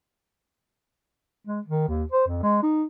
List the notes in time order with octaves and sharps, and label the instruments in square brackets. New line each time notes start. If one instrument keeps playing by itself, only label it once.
[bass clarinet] G#3
D#3
D#2
C5
F2
G#3
D#4